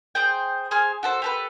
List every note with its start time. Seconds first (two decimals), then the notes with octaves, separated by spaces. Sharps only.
0.15 G#4 C5 G5
0.71 G#4 C5 G#5 F6
1.03 F#4 A4 C5
1.22 G4 A4 B4